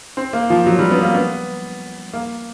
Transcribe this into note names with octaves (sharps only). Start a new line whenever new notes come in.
C4
A#3
F3
F#3
G3
B3
A#3
B3
A#3